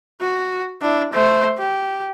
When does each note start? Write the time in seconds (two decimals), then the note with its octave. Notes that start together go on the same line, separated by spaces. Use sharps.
0.21 F#4
0.82 D4 E4
1.13 A3 C5
1.58 G4